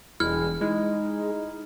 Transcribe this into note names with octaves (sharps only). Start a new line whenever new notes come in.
E1 G2 G3 G#3 E4 F6
G#3 D#4 E4